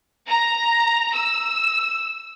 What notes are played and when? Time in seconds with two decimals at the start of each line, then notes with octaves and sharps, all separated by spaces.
0.28 A#5
1.14 E6